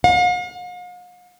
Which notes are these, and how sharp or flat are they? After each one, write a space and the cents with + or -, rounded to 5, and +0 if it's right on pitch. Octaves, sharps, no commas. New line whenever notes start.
F5 +45